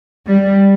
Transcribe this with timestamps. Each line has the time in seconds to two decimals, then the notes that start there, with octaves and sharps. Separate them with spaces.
0.25 G3